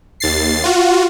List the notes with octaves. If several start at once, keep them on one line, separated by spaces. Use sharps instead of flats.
D#2 A6 C7
F4 F#4